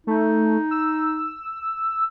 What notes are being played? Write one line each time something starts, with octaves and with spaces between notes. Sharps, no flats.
A3 D#4
E6